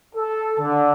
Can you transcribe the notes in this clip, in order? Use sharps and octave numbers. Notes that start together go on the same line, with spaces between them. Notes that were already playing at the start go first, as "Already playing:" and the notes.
A4
D3